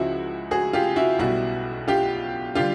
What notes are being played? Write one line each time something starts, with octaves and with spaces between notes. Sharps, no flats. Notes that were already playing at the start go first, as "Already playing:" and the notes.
Already playing: C#2 C#3 F3 G#3 E4 F#4
F#4 G#4
F4 G4
E4 F#4
B1 B2 G3 E4 F#4
F4 G4
D3 G3 F4 G4